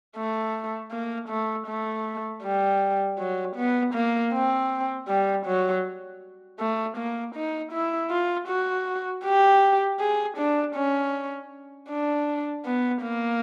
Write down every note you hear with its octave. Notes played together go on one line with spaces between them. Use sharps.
A3
A#3
A3
A3
G3
F#3
B3
A#3
C4
G3
F#3
A3
A#3
D#4
E4
F4
F#4
G4
G#4
D4
C#4
D4
B3
A#3